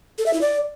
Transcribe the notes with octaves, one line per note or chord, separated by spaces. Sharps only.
A4
E5
E4
D5